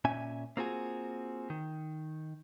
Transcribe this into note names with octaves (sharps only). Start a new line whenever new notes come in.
A#2 C#4 E5 G#5
A#3 C4 F4 F#4 G#4
D#3